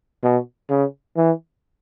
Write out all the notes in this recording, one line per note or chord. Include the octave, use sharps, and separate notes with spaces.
B2
C#3
E3